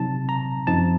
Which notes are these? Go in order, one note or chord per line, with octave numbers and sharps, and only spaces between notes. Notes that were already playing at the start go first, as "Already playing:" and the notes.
Already playing: C3 F#3 C4 D#4 A5
A#5
F#2 F3 C4 D#4 A5